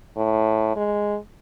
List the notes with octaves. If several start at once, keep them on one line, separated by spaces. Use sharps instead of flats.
A2
G#3